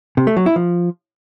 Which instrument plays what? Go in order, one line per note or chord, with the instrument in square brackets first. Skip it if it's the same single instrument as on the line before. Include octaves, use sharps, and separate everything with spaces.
[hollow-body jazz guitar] C3
A3
F#3
E4
F3